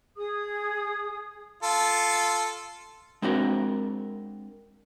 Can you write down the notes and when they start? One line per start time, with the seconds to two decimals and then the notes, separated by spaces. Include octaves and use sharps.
0.16 G#4 D#6
1.63 F4 A4
3.22 G#3 C4 D4 F#4 A#4